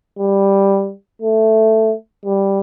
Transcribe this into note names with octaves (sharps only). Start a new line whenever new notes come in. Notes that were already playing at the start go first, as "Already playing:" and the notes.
G3
A3
G3